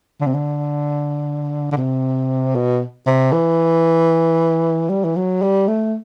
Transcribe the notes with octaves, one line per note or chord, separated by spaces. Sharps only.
D3
C3
D3
D3
C3
B2
C3
E3
G3
E3
F#3
G3
A3